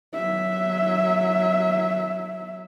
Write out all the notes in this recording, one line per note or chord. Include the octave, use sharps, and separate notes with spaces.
F#3 E5